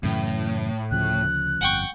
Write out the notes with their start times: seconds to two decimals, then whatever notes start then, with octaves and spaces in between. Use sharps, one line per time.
0.03 F#2 A2 C#3 E3
0.91 D2 C#3 F3 F#6
1.61 G1 F2 F#5 G5 C#6